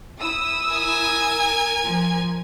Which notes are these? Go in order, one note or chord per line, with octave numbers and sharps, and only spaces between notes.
E4 D#6 E6
A#4 G#5
F3